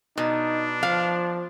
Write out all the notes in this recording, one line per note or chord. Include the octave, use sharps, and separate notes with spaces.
B2 D4 D#4
F3 F5